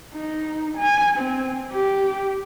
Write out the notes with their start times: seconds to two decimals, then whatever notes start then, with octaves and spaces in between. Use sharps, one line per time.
0.13 D#4
0.78 G#5
1.18 C4
1.72 G4